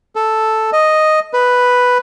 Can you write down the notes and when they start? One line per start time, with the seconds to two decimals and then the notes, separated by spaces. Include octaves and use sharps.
0.16 A4
0.73 D#5
1.33 B4